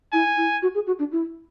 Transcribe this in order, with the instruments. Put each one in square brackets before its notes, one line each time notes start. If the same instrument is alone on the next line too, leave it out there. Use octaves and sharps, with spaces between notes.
[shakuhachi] E4 [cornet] G#5
[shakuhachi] E4
F#4
G#4
F#4
D4
E4